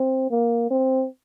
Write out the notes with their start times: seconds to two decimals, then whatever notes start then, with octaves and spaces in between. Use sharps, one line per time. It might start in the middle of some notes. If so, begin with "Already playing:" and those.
Already playing: C4
0.30 A#3
0.70 C4